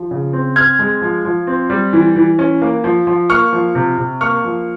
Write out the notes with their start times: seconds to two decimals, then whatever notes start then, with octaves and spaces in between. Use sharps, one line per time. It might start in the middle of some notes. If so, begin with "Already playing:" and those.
Already playing: F3
0.11 C#3
0.33 C4
0.56 C4 F6 G#6
0.79 G#3
1.02 F3
1.25 F3
1.47 C4
1.70 G3
1.93 E3
2.16 E3
2.39 C#4
2.62 A#3
2.84 F3
3.07 F3
3.30 A#3 C#6 F6
3.53 F3
3.75 C3
3.98 C3
4.21 A#3 C#6 F6
4.44 F3